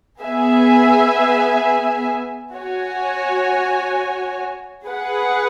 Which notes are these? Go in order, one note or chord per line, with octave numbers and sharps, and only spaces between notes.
B3 G#4 E5 G#5
F#4 C#5 G#5
G#4 B4 F#5